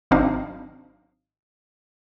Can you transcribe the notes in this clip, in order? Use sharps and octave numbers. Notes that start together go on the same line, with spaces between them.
G#1 F#3 C4 D4 D#4 F5